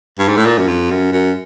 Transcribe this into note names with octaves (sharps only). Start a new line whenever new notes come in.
G2
G#2
A2
A#2
F#2
F2
F#2
F#2